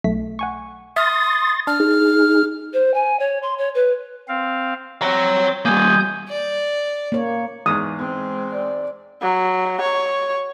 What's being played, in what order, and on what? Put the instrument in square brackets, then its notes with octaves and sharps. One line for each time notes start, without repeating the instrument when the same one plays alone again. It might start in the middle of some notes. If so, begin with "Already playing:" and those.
[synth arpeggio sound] B1 A3 B6
F#5 G#5 C#6
[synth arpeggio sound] E5 F6 [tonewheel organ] C6 A6 [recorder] D#6
[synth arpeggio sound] D4 [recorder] F6
[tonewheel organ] D#4 G#4
[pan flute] C5
G#5
C#5
C6
C#5
B4
[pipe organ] C4 F5
[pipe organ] C4 [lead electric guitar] C#5 A#5
[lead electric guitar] G3 A#3 [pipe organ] G#5 D#6 G6
[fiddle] D5
[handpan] A#3 C#5
[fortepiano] E2 G#2 [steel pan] D#6
[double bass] G#3 C4
[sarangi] D5
F#3
C#5